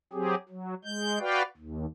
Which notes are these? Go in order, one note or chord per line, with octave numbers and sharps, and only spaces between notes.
F#3 C4 G4 G#4
F#3
G#3 G6
F#4 B4 D5 F5 G5
D#2